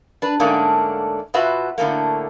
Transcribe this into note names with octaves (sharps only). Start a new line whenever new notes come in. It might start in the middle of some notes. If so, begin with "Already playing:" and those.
D4 B4
G#2 D3 A3 A#3 C#4 D4
B2 F4 F#4 B4 E5
A2 D3 F3 A3 A#3